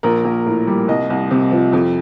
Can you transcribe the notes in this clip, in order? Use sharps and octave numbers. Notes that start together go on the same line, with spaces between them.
A#1 A#4
A#1
A2
G3
C2 D#5
C2
C3
F3
F2